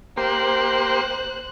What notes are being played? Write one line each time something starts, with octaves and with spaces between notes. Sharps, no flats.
A#3 G4 C5 C6 F#6